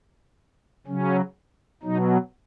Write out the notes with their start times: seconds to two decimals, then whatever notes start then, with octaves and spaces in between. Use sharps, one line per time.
0.87 C#3 F#3 C#4
1.83 B2 F#3 D#4